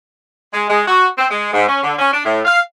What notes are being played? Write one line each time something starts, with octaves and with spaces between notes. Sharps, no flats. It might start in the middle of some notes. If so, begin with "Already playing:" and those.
G#3
G#3
F#4
C4
G#3
G#2
C#4
D3
C#4
D4
A2
F5